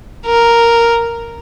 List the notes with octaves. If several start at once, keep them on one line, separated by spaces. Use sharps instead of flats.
A#4